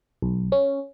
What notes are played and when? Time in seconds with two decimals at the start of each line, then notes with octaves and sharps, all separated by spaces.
0.22 B1
0.52 C#4